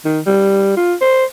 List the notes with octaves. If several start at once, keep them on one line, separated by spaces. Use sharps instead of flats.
D#3
G3
F4
C5